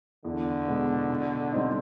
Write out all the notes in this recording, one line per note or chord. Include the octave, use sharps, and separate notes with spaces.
E2 D3
B2 G#3 B3
B2
G3 C4 D#4